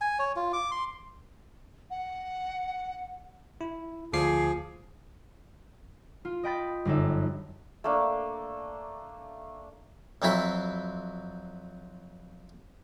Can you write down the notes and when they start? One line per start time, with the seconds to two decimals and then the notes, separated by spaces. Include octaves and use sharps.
0.01 G#5
0.19 C#5
0.36 F4
0.53 D6
0.71 C6
1.90 F#5
3.61 E4
4.13 D2 F3 G#4 D6 C7
6.25 F4
6.43 D#5 G5 B5 A6
6.85 G1 F#2 D#4 A4
7.84 A3 A#3 D4
10.22 F2 F#3 C4 E4 B5